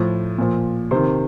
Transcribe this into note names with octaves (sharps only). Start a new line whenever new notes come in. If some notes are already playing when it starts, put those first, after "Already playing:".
Already playing: A2 F3
A#2 F3
C3 D#3 C5